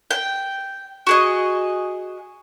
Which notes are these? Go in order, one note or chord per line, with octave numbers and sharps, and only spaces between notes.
G5
F#4 G#4 D#5